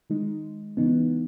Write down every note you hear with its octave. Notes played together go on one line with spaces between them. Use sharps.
D#3 G#3 D#4
C#3 E3 B3 D#4